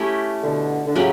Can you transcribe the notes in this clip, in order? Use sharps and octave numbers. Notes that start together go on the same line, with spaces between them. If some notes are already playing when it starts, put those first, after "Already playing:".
Already playing: A3 C#4 E4 G4
B2 D3
D3
A2 C#3 F#3 C#4 G4 B4